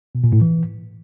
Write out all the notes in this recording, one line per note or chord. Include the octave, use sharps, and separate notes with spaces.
B2
A#2
A2
E3